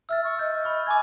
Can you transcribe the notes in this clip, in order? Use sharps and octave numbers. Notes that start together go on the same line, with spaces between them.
E5 E6 F6 A6
C#6
D#5 G6
B5 C#6 F6
G#5 D6 G#6